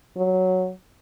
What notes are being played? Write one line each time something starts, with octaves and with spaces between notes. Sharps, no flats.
F#3